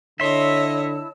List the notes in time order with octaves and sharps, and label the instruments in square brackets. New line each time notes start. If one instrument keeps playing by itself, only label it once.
[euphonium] D3 [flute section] E4 A5 E6 [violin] C#5 D#5 [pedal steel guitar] E5 C6